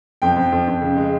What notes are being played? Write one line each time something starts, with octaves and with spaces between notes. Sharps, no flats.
F2 G5
F2
F2
F2
C#3
G#3